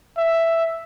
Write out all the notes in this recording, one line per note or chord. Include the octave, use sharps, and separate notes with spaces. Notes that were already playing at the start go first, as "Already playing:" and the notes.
E5